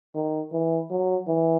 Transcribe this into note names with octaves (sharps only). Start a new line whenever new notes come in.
D#3
E3
F#3
E3